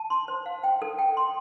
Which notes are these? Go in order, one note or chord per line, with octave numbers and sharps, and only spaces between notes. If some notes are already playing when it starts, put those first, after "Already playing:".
Already playing: A5
C6
C5
F5
G5
A4
G5
C6